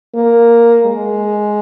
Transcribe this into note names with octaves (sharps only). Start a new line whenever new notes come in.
A#3
G#3